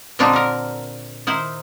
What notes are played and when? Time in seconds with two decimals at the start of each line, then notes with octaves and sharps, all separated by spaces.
0.19 A#2 D3 C4 D4 D#4
0.33 D3 A#4
1.27 D#3 E4 C5